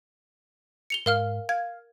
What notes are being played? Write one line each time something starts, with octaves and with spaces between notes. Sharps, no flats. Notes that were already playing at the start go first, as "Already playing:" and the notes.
C#7 F7 G7
G#2 A#4 F5 F6
F5 G#6